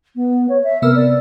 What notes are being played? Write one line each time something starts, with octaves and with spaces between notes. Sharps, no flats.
B3
C#5
E5
C3 B3 A#4 E6
D5